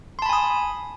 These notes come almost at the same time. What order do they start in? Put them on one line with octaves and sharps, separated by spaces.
C6 A5 B5 G#5 D#6